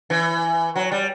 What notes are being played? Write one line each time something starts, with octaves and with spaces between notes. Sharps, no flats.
E3
F#3
G3